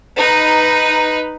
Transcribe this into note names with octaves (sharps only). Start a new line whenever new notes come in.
D#4 B4